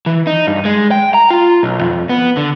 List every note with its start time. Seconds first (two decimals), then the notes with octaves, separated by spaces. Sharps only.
0.06 E3
0.27 D#4
0.47 G2
0.65 G#3
0.91 G5
1.14 A#5
1.30 F4
1.63 B1
1.81 F2
2.09 B3
2.37 D3